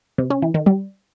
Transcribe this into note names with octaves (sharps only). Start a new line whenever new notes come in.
C3
C#4
E3
D#3
G3